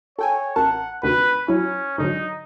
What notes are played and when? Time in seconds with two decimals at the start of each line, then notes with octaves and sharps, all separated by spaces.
0.19 A4 C#5 G5 G#5
0.56 A1 A#4 F#5 A5
1.03 D2 C3 D#3 B4
1.48 F#3 C#4 E4
1.98 G#2 D3 F#3 D#4